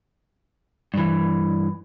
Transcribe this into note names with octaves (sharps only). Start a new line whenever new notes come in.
G2 E3